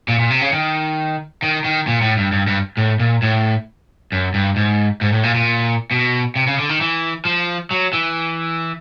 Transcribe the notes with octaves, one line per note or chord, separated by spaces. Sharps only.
A#2
A#2
C3
C#3
D#3
D#3
D#3
A#2
A2
G2
G2
G2
A2
A#2
A2
F#2
G2
G#2
G#2
A2
A#2
A#2
B2
C3
C#3
D3
D#3
E3
F3
F#3
E3